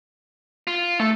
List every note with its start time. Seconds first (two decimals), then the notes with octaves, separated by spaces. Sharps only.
0.67 F4
1.00 A3 A4